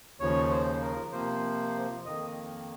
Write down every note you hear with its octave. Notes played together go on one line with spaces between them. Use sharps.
D#2 C#3 F3 C#5
C5
A#4
C3 F3 A#3 C5
F2 D#3 A#3 D#5